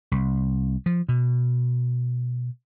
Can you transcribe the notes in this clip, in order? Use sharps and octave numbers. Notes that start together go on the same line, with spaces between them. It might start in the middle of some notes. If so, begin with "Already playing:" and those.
C2
F3
B2